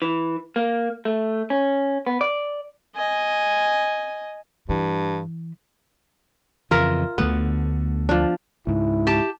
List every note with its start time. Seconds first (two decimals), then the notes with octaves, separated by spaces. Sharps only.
0.02 E3
0.56 A#3
1.05 A3
1.50 C#4
2.07 B3
2.21 D5
2.96 D#5 G#5
4.69 G2 E3
6.71 F2 C#3 E3 F4 A#4 E5
7.18 D2 D3 A3 B3
8.09 F3 D4
8.67 C#2 G#2 E4
9.07 G4 A5